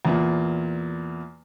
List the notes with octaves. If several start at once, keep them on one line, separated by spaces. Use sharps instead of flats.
E2 A#2